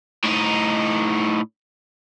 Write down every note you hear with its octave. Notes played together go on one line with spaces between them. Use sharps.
A2 D#4